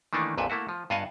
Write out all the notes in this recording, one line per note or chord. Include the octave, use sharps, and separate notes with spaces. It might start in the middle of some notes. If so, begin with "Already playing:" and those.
D#3 E3 A3 A#3 D4 D#4
A#1 F2 A#2 B4 E5
A3 A#3 E4 F#4
F3
G2 F4 D#5 F5 F#5 G#5